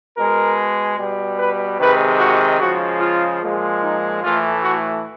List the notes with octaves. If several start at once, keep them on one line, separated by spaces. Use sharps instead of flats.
B2 G#3 A#4
B2 G3
B4
C3 D#3 G#3 B4
F#4
C#3 F3 G#3 F#4
F4
A#2 F3 G#3
D#4
A2 E3 A3 F4
F#4